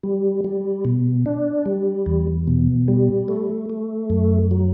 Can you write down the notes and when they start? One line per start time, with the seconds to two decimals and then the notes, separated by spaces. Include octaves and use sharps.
0.03 G3
0.44 G3
0.85 B2
1.26 D4
1.66 G3
2.06 E2
2.47 B2
2.88 G3
3.28 A3
3.70 A3
4.10 F#2
4.51 F#3